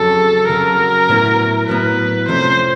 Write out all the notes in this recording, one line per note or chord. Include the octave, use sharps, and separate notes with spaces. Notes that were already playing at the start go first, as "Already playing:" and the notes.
Already playing: F2 C#3 F#3 A4
F2 C#3 F#3 A#4
A2 F#3 B3 E4
A2 F#3 B3 E4 B4
F2 C3 F3 A3 C#4 C5